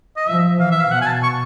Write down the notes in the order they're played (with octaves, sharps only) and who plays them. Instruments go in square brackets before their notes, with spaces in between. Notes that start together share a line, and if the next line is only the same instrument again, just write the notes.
[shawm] D#5
[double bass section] F3 [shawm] E5
[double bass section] E3 [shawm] F5
[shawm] E5
F5
[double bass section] B2 [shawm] F#5
[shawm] G#5
A5
C#6